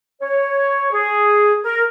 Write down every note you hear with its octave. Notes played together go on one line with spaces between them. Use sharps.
C#5
G#4
A#4